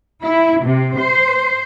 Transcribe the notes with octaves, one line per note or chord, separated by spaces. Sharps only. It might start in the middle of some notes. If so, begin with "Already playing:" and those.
E4
C3
C5